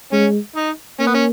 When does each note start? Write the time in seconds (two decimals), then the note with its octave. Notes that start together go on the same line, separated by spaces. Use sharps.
0.12 G#3 C#4
0.56 D#4
0.99 A#3 C#4
1.07 B3
1.14 C#4